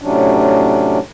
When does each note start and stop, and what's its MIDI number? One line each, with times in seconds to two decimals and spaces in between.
0.01 0.99 45
0.01 0.99 48
0.01 0.99 54
0.01 0.99 61
0.01 0.99 62